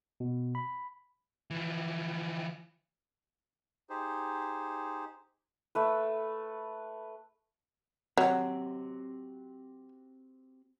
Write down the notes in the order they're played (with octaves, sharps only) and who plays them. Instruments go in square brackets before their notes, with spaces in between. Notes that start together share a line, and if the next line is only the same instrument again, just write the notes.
[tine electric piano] B2
B5
[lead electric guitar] E3 F3
[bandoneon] D#4 G4 G#4 C5
[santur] A3 B4
[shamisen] F#3 [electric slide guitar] C4 F#4 G4